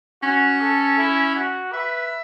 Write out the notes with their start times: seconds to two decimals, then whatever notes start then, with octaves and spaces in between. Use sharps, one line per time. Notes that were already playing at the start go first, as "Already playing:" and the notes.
0.23 C#4 F#4
0.61 A4
0.98 E4
1.36 F#4
1.73 B4 E5